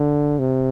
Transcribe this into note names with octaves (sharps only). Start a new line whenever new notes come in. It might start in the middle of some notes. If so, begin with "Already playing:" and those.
Already playing: D3
C3